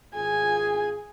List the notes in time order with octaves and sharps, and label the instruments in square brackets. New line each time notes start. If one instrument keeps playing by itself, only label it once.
[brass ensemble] G#1 F4 G#4 [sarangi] G#5